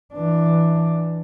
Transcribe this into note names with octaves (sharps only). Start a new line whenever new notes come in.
E3 D4